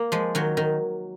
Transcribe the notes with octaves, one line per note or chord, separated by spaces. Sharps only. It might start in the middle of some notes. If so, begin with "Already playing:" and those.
Already playing: A#3
F3 G#3
D#3 F#3
D#3